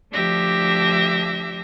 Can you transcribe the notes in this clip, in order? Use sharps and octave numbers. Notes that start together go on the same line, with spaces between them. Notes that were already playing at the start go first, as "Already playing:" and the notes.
D2 F3 D4 G4 E5 A#6